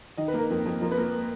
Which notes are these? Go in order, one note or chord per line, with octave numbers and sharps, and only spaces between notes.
D#3 D#5
B4
A#3
A#4
F2
F2
F3 A#4
B4
A#3 A#4